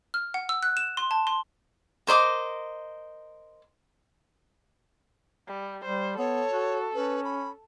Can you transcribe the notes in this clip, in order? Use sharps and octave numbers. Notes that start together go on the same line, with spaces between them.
F6
F#5
E6
F#6
E7
C6
A5
C6
A#4 C5 D#5 D6
G3
G3 C5
B3 A4 C#5
F#4
C#4 B4
B5